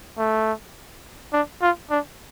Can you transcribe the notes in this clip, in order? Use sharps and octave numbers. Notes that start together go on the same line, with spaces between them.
A3
D4
F4
D4